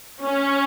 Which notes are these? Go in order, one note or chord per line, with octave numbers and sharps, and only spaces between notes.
C#4